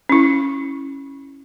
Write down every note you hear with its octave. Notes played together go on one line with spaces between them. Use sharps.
C#4 E4